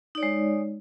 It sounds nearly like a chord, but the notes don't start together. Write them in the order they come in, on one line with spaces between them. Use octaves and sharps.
D#4 D5 C#5 G#3